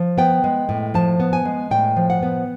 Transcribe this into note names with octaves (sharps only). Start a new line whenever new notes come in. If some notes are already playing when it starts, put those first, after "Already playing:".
Already playing: F3
B3 G5
G#3
A2
F3 A5
B3
G#5
G#3
A2 G5
F3
F#5
B3